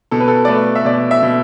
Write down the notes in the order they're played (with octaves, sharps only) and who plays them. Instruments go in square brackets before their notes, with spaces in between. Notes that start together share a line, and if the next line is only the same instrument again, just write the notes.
[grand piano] B2 A4
B4
A4
D5
A3 B4
E5
B2 D5
E5
B2